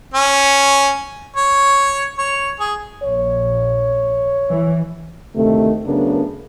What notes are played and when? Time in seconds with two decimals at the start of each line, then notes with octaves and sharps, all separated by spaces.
0.14 C#4
1.36 C#5
2.18 C#5
2.60 G#4
3.03 A#1 C#5
4.50 E3
5.35 D2 C3 D#3 A3
5.85 F#2 C#3 A3 B3 D4 A#4